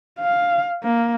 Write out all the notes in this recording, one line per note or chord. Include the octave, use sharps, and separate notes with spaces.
F5
A#3